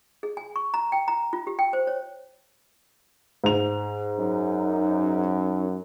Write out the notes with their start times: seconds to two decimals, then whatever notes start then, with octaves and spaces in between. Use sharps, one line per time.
0.23 G#4
0.37 G#5
0.56 C#6
0.74 A#5
0.92 G5
1.08 A#5
1.33 F4
1.47 G4
1.59 G5
1.73 C5
1.87 C#5
3.44 G#2 F7
4.18 F#2 D#4